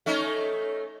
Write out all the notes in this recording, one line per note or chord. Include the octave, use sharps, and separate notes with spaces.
A3 C#4 D#4